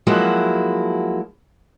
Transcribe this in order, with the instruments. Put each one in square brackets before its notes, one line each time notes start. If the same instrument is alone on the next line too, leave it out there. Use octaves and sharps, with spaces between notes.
[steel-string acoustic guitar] F3 F#3 G#3 A#3 E4 F#4